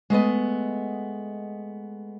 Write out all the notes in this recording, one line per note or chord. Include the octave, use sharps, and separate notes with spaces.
G#3 A3 B3 D#5